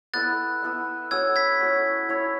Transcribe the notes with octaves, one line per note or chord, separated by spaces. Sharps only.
B3 E4 A4 E5 F#6 A6
B3 E4 A4 E5
C#4 F#4 A4 C#5 E6 G#6
G#6 B6
C#4 F#4 A4 C#5
E4 A4 C#5